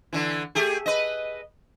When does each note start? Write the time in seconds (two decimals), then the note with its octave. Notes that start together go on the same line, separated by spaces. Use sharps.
0.13 D3 E3
0.55 A3 G4 G#4
0.86 B4 D#5